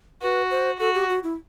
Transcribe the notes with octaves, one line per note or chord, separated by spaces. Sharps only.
F#4 B4
C5
F#4 A4
G4
F#4
E4